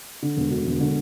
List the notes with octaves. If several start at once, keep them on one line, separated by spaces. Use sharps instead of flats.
D3
E1
D2
E1
D3